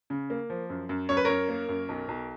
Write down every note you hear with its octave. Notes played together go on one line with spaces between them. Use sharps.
C#3
A#3
F3
F#2
F#2
F#2 C#5
B4
F#2 A#4 C#5
A#3
F#2
B1
B1